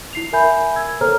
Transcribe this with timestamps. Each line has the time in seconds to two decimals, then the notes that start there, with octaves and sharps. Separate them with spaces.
0.13 E4 C7 F7
0.33 A#4 E5 G#5 B5 G6
0.76 E6 G#6
1.01 A4 A#4 C5 C#5 A#5 F6